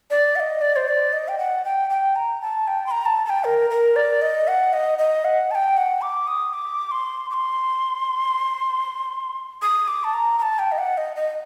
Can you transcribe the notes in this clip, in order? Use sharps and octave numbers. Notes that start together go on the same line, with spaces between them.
D5
F#5
D#5
D5
C5
D5
D#5
G5
F#5
G5
G5
A#5
A5
G5
C6
A#5
A5
A5
G5
A#4
A#4
D5
D#5
F#5
D#5
D#5
F#5
A5
G5
F#5
D6
D#6
D6
C6
D6
C6
D#6
D6
A5
A#5
A#5
A5
G5
D#5
F#5
D#5
D#5